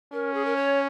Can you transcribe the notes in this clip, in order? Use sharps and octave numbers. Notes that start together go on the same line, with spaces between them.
C#4 A#4
G#4
A#4
C#5